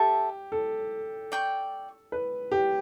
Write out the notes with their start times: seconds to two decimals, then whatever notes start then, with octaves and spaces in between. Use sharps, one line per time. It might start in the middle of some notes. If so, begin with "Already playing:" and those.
Already playing: G4 A4 E5 A5
0.52 A4
1.32 D5 G5 C#6
2.12 B4
2.52 G4